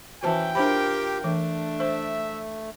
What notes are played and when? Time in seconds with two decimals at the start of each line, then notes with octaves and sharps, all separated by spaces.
0.23 E3 C#4 F#4 C5 G5 A5
0.55 D4 F4 G4 A#4 C5 B5
1.24 E3 A3 D4
1.80 C5 E5